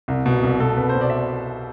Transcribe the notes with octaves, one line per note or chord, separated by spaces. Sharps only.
C2
B2
C2
B2 A4
C2 B4
C5
B2
D5
E5
D5